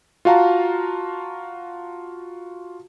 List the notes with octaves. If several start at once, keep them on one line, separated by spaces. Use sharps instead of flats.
F4 F#4 F5 A5 A#5